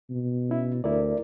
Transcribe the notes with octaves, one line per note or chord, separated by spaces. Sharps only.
B2
C#4 E4
D2 E4 A#4 D5